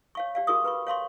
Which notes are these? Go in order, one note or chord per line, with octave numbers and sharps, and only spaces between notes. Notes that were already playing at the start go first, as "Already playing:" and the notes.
C#5 F5 C#6
G4 D5 F5
F#4 G#4 A#4 C#6 D#6
B4 B5 C#6
C#5 F5 C6 C#6